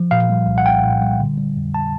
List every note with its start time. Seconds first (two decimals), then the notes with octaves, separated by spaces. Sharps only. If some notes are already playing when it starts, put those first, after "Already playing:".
Already playing: F3
0.11 A#2 F5
0.30 G3
0.47 C2
0.58 F#5
0.66 C2 G5
0.84 A#2
1.01 G3
1.20 D3
1.38 G3
1.57 F2
1.74 A5